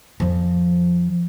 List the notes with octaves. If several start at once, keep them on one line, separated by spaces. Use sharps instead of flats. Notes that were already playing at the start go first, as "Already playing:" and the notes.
F2 F3